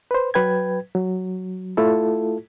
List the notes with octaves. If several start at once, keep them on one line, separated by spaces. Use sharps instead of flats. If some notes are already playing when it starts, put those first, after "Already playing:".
B4 C5
F#3 B4 G5 G#6
F#3
A3 E4 F4 A4